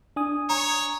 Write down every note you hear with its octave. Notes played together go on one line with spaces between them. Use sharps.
D4 G#5 D#6
C#5 A#5